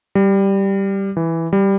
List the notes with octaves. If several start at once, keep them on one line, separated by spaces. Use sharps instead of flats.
G3
E3
G3